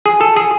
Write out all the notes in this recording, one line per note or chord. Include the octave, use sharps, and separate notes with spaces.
G#4
A4
G#4